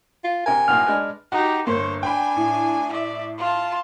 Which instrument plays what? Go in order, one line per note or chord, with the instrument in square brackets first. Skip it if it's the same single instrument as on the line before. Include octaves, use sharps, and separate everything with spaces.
[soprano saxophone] F4
[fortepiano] C3 A#4 [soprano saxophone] G#5
[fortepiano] B1 A2 A#3 [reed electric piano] F6
[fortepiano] G#3 D4 B4
[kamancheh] D#4 G4 [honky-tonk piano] F#4
[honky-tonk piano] G1 A#3 [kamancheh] C5 C#5
[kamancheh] D4 G#5 [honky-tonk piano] G5 B5
[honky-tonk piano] A2
[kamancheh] D5 E5
F4 A5